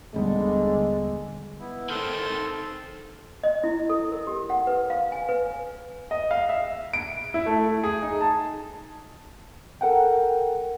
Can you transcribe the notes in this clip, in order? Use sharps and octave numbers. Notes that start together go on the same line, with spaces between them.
D#1 D3 G3 G#3 B3
B3 E4
D#3 C4 A4 C6
D#5
E4
A4
A#4
G4
F#5
B4
F5
G#5
B4
D#5
F5
E5
D7
E4
A3
G#4
D#4
A5
A4 A#4 F#5 G5